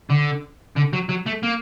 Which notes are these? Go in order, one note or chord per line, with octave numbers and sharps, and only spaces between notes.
D3
D3
F#3
F#3
A3
A#3